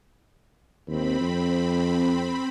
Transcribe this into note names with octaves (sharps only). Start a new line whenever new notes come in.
D#2 C4 B5
F2